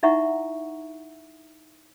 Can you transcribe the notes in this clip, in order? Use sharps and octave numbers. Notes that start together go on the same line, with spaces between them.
D#4 E4 E5 F#5 A#5 C#6